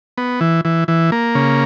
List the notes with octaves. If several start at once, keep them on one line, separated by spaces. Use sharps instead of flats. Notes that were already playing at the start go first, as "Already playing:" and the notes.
B3
E3
E3
E3
A#3
C#3